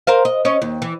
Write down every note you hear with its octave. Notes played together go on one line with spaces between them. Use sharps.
A#4 C5 F5
D#5
C#4 C#5 D#5
D#2
E3